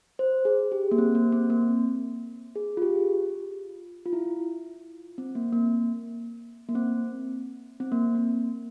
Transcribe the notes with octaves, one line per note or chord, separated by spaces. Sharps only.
C5
G#4
G4
A#3
C4
A#3
C4
A#3
G#4
F4
G4
F4
E4
C4
A#3
A#3
A#3
C4
C4
A#3
A#3